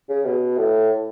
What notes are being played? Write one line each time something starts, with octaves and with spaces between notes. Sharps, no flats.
C#3
B2
A2